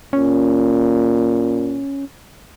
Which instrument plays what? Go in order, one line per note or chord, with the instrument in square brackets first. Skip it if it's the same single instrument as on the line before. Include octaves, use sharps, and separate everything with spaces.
[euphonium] A#2 [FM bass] C#4